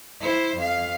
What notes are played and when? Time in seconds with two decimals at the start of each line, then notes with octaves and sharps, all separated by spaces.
0.21 E4 C5
0.57 F2 F5